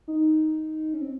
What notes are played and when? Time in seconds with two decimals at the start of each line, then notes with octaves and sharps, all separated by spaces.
0.08 D#4
0.94 C#4
1.01 C4